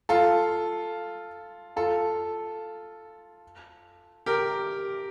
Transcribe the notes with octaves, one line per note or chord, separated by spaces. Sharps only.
F4 A4
F4 A4
G4 A#4